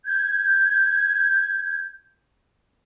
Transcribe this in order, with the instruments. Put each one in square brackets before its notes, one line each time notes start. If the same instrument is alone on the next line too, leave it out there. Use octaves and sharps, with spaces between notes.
[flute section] G6 G#6